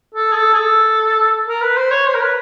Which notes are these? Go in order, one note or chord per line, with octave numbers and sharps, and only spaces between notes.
A4
G#4
A4
G#4
A4
A#4
B4
C5
C#5
C5
A#4
B4